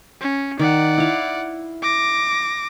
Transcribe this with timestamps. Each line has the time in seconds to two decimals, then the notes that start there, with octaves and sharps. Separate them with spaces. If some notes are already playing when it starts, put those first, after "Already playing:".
0.21 C#4
0.59 D#3 D5 F#5
0.98 E4 F5
1.82 D6 A#6